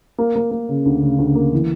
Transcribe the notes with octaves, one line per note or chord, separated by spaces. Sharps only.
A#3
A#3
A#3
C#3
D2
C#3
D2
A#3
E3